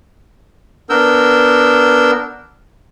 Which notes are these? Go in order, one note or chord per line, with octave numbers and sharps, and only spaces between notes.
B3 D4 A#4 E6 G6